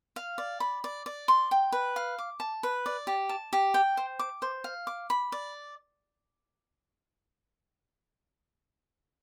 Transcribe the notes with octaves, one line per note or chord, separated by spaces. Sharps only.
F5
D5
B5
D5
D5
C6
G5
B4
F5
D6
A5
B4
D5
G4
A5
G4
G5
C5
D6
C5
F5
D6
B5
D5